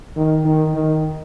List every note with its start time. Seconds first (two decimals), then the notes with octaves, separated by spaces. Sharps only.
0.17 D#3
0.45 D#3
0.74 D#3